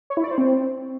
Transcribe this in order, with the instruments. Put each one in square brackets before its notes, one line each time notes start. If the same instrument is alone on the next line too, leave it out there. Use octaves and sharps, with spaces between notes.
[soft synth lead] C#5
E4
D5
C5
C4